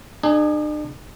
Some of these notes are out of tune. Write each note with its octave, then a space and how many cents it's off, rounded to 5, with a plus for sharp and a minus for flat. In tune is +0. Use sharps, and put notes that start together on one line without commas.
D4 +45 G#4 +0